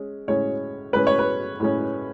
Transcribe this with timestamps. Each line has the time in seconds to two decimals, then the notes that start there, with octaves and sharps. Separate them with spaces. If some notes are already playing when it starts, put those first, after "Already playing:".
Already playing: G#3 C#4
0.28 A2 G#3 C#4 C#5
0.93 A2 G#3 C#4 B4
1.07 C#5
1.19 B4
1.60 A2 G#3 C#4